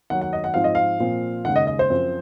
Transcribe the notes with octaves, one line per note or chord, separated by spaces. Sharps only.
D#2 D#3 F#3 F#5
F#5
D#5
F#5
G#2 F3 C4 F5
D#5
F5
A#2 F3 C4
D#2 C#3 G#3 F#5
D#5
D#5
C5
F#2 F3 C4